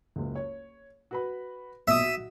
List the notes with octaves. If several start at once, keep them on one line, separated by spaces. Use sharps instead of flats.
F#1 C#2
C#5
F#4 B4 B5
B1 A#2 E5 D#6
F#4